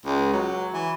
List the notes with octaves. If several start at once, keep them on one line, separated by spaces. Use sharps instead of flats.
C#2
F#3
E3